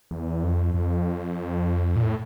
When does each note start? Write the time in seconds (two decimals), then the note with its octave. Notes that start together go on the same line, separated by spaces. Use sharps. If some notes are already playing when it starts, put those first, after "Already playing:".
0.11 E2
0.43 F2
0.74 F2
1.96 A#2
2.03 A2